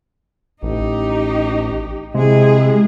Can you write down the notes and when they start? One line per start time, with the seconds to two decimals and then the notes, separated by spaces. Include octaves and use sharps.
0.63 A1 D#4 G4
2.14 C3 G#3 E4 G#4